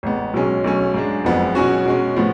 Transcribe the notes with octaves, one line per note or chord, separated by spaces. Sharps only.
A1 G#2 G#3 B3
B1 B2 G#3 C#4
B1 B2 A3 C#4
G#2 G#3 D4
F#1 F2 F3 G#3 B3
B2 F#3 C#4 F#4
B2 G#3 C#4
A2 F3 B3